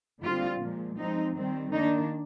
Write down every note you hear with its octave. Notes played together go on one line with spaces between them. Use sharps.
D3 G3 C4 F4
A#2 F3 G#3
F3 G#3 C4 D#4
D#3 G3 C4
D#3 A#3 D4 D#4